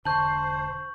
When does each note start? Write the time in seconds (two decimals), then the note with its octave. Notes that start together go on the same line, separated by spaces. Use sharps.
0.05 E1 D3 C5 A5 C#6 G6 F#7